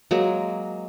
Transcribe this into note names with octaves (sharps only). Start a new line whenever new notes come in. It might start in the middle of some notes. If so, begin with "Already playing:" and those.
F#3 G#3 A#3